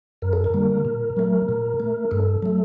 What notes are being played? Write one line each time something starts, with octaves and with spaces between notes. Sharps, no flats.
F#2 A#4
A4
A#4
D3 G3 A#3
A#2
F#3 A3
A#2
A3
G2 A4
F#3 A3